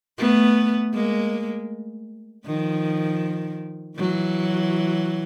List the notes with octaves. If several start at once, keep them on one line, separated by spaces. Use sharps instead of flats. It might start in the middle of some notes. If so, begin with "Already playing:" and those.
A3 B3
G#3 A#3
D#3 F3
E3 F#3